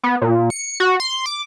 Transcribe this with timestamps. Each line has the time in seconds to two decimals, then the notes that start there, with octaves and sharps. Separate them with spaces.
0.03 B3
0.22 A#2
0.50 C#7
0.80 F#4
1.00 C6
1.26 D6